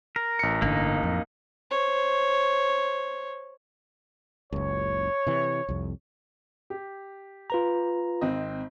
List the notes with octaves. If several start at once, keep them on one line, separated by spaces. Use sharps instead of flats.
A#4
A1 C#7
G1 D3 A#3 D#4
F2
C5 C#5
F#1 C#2 C#5
C3 E3
C2 F2
G4
F4 B4 A#5
G#1 C4 D#5